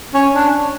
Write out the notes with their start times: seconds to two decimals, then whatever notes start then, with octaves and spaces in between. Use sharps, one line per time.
0.14 C#4
0.34 D4